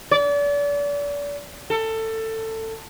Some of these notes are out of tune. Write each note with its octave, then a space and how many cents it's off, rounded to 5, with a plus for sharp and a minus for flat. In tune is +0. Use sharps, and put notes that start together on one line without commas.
D5 -35
A4 +20